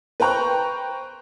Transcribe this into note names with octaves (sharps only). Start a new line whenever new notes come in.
B4 C5 G5 A#5 C#6 F#6